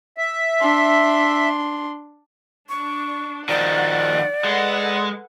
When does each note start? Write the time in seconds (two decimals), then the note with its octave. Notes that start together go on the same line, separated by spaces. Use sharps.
0.17 E5
0.61 D4 C6
2.69 D4 C#6
3.49 D#3 F3 D5 F#5
4.44 G#3 A4 B4 F#5